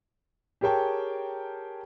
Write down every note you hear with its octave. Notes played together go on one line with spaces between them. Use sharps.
G4 G#4 A#4 C#5 G5 A5